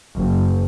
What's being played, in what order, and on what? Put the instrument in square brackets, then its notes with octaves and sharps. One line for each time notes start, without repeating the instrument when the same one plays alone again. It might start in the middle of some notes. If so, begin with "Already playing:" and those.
[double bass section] F#1